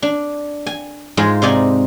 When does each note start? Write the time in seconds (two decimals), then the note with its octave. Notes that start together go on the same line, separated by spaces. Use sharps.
0.02 D4
0.66 G#5
1.17 G#2 G#3 F4
1.42 C3 D#4 D5 G#5